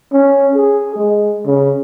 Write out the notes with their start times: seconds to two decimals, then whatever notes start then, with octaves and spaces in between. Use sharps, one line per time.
0.12 C#4
0.55 G#4
0.96 G#3
1.46 C#3